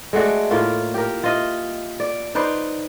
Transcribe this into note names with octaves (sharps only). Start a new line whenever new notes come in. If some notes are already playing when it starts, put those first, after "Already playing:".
G#3 A3 F#4 D5
A2 A#3 F4
G4 A#4
F4 D#5 E5
D5
D#4 B4 C5 D5